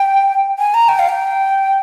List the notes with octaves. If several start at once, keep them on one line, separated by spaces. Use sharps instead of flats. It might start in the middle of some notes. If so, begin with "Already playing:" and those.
Already playing: G5
G#5
A#5
G5
F5
G5